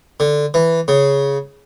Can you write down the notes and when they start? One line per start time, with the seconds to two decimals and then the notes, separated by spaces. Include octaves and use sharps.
0.20 D3
0.54 E3
0.88 C#3